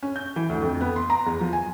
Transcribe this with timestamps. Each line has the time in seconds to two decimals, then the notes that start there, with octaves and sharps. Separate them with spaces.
0.03 C#4
0.16 G6
0.36 E3
0.49 D2
0.62 F2
0.81 B3
0.96 C6
1.10 A#5
1.26 E2
1.41 F3
1.53 G#5